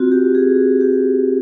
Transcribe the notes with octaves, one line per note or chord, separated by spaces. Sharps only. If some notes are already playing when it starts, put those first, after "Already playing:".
Already playing: C4 F4 F#4
G4
G#4
G4